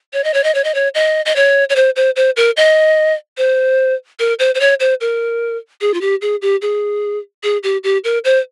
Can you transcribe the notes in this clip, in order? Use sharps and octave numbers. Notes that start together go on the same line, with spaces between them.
C#5
D#5
C#5
D#5
C#5
D#5
C#5
D#5
D#5
C#5
C#5
C5
C5
C5
A#4
D#5
C5
A#4
C5
C5
C#5
C5
A#4
G#4
F4
G4
G#4
G4
G#4
G#4
G4
G4
A#4
C5